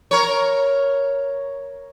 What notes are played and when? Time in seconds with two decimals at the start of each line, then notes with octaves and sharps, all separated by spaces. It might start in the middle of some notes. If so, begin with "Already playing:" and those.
0.11 A#4 C#5